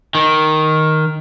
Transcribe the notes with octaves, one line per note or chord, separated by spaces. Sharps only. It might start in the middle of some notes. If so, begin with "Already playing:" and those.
D#3